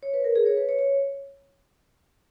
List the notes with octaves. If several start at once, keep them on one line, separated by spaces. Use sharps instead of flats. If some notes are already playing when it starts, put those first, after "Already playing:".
C#5
B4
A#4
G#4
C#5
B4
C#5
C#5